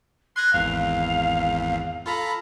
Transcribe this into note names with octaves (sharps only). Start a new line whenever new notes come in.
C6 F#6 G#6 A#6
G#1 E2 F5
F4 A4 A#5 B5